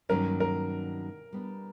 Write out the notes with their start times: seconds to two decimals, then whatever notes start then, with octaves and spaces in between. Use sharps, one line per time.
0.09 G2 D#3 F#3 A#3 C#4 A#4
0.40 A#4
1.33 G3 B3 D4